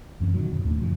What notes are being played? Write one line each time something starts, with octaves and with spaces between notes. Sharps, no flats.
F#2 E3 C4
A#2 D3 D#3 F#3
F#2 B2
D#2 A2 G#3 D4
F#2 A#2 C#3 F3